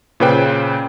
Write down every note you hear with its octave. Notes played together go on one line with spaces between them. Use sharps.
A#2 C#3 B4 C5 G5